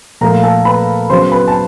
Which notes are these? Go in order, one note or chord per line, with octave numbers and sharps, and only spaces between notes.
A#2 F3 A3 A#4 A#5
A4 A5
B4 B5
C#3 F#3 B3 C5 C6
B4 B5
A5